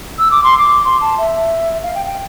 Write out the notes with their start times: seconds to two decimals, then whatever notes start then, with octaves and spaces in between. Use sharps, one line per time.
0.19 E6
0.31 D6
0.44 C6
0.58 D6
0.84 C6
1.01 A5
1.18 E5
1.83 F5
1.95 G5
2.06 G5